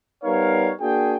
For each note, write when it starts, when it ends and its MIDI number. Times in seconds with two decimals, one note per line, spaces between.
0.24 0.71 55
0.24 0.71 59
0.24 0.71 63
0.24 0.71 70
0.24 0.71 73
0.24 0.71 77
0.81 1.17 58
0.81 1.17 62
0.81 1.17 66
0.81 1.17 68
0.81 1.17 79